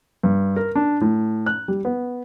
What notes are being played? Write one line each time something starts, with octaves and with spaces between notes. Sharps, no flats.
G2
A#4
D4
A2
F#6
G3
B3